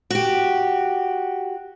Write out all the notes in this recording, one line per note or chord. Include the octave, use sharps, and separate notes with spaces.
F#4 G4